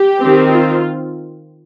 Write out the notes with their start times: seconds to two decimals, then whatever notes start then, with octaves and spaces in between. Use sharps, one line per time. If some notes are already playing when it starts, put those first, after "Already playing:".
Already playing: G4
0.20 D#3 C4
0.53 F4